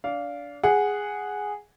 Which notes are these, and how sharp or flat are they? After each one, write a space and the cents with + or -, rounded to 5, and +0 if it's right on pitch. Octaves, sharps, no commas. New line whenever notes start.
D4 -25 F5 +0
G#4 -5 F#5 +0